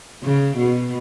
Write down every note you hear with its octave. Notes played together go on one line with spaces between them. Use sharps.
C#3
B2